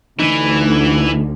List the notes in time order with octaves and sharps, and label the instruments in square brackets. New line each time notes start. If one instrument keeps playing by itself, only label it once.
[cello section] D2 [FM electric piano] D3 D4 D#4 [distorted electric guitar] E3